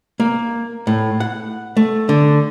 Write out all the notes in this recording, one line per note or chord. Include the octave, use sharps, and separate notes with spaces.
A#3
A2
F#5
A3
D3